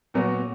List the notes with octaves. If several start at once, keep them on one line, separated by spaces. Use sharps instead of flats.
A#2 F#3 B3 F#4